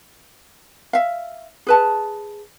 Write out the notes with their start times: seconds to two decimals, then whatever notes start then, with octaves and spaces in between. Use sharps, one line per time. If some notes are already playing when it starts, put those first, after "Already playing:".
0.93 E5 F5
1.67 G#4 B4 A5